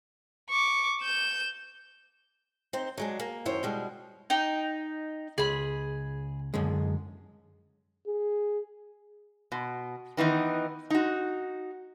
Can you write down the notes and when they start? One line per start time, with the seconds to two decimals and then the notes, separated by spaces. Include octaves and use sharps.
0.50 C#6 D6
1.02 G6 E7
2.73 C4 D#4 C5
2.98 F#3 G#3 D4
3.20 A#3
3.45 F#2 D#3 E4 C5 C#5
3.63 B2 G3 G#3
4.30 D#4 G5
5.38 C#2 G#4 B5
6.54 F#2 D3 G#3
8.07 G#4
9.52 B2
10.17 D#3 E3 B3 D#4
10.90 D#4 F#4